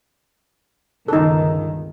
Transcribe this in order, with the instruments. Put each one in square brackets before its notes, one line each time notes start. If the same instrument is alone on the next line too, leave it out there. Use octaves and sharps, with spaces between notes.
[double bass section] G1 C#2 D#3 [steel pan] D#4 A4